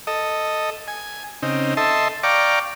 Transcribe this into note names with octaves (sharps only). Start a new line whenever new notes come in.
A4 D#5
G#5
C#3 C4 D#4
A4 D#5 E5 A5 C6
D5 F5 G5 A#5 C#6 D6